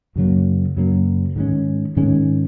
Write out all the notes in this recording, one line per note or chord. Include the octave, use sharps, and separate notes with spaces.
F#2 C#3 F#3 A#3
F#2 C#3 F#3 A#3
G#2 D#3 G#3 C#4
G#2 D#3 G#3 C#4